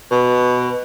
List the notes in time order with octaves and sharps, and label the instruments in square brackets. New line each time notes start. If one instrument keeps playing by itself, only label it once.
[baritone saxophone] B2